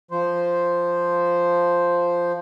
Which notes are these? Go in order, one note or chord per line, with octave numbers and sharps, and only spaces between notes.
F3 C5